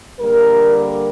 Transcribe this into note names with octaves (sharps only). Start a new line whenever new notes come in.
D3 G3 A#3 A#4
A#4